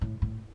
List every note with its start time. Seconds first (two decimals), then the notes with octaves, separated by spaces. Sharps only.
0.01 A2
0.22 A2